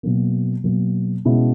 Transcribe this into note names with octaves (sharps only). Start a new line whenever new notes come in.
B2 F#3 A#3
B2 F#3 A#3
B2 G#3 C#4 E4